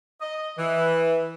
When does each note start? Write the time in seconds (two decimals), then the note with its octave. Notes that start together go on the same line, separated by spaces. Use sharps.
0.21 D#5
0.58 E3